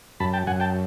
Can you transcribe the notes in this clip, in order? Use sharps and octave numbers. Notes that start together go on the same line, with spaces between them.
F#2 A5 B5
G5 A5
F#2 F#5 G#5
G5 A5